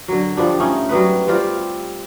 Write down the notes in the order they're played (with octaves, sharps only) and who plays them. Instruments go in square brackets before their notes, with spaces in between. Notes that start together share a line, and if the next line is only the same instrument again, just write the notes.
[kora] D3 F#3
F3 G3 D4
A3 C#4 D#4
F#3 G3 B3 B4
G3 C4 F4 G4